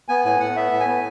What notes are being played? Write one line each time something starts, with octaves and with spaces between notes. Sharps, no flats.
B3 G#5
A2 G#5
A2 F#5
B3 E5
A2
G#5
B3